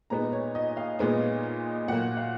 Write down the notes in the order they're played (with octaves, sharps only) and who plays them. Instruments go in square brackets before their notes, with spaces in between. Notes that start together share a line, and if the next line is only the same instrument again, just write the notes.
[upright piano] A#2 G#3 B3 D#4 A#5
C#5
D#5
F5
A#2 G#3 B3 D#4
A#2 F#3 A#3 F#5
F5